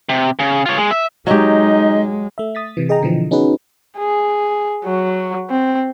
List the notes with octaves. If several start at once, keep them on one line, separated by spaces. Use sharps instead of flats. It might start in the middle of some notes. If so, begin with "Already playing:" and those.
C3
C#3
F4 C#5
G#3
E5
F#3 G#3 D#4 G4 D#5
A3 E5
D#6 A6 B6
C3 E3
G#4 D#5 G5 A#5
B2 D3 E3 F3
B3 C#4 D#4 F#4 G#4 B4
G#4
F#3
C4